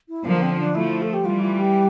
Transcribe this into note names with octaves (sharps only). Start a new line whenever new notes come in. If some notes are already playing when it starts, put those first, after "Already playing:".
E4
D3 F3 A#3
C4
C4
D4
F3 A3 E4
A4
G4
E3 G3 F4
F4
G4